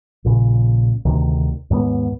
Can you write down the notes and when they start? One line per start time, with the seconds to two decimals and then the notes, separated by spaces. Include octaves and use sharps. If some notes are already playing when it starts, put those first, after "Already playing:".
0.25 A#1 A#2 C#3
1.05 D2 C3 D#3
1.70 D#2 G#2 G#3 B3